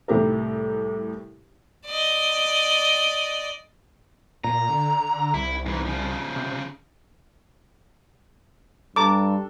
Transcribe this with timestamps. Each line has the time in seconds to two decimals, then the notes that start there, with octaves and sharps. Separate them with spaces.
0.08 C2 A2 G4 A#4
1.87 D5 D#5
4.44 A#2 A#5
4.69 D3
5.34 C2 E4
5.66 G#2 E3
5.85 C#3 F3
6.36 C3
8.96 G2 D4 A4 A#5 D6